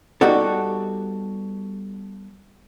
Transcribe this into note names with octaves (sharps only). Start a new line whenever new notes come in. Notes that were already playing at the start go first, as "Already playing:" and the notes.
G3 B3 D#4 F#4 G4 A4